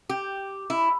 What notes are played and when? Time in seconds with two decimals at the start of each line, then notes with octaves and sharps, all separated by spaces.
0.09 G4
0.70 E4